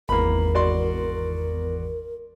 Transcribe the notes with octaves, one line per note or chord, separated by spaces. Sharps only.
G#1 E2 A#3 A#4 B5
F#4 D5 C6